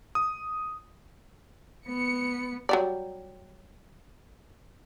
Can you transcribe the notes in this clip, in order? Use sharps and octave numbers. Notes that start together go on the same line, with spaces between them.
D#6
B3 C#7
F#3 G3 D5